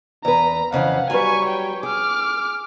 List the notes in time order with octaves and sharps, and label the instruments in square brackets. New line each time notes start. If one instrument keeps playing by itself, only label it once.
[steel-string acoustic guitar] E2 B4 [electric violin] A#5
[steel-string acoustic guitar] F2 C#3 E3 [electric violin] F5 F#5
[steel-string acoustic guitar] F#3 G3 B4 [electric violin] G#5 C#6
[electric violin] C#5 G5
[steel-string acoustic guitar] G#4 [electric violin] D6 F6